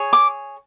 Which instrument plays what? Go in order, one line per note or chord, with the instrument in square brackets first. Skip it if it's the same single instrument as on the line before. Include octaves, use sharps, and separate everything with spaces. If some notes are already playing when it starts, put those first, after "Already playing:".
Already playing: [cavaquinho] G#4 C#5
D6